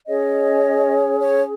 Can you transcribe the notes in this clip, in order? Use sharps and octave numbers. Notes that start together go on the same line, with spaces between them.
C#4 G#4 C#5 D#5
C#5